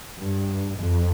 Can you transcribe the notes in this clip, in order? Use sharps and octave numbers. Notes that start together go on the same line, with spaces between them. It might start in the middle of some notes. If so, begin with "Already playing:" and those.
G2
F2